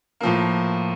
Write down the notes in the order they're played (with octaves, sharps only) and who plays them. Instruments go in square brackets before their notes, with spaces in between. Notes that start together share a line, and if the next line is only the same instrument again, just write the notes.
[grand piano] A2 F3 A#3